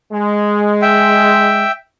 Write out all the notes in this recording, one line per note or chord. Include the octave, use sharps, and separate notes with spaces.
G#3
E5 G5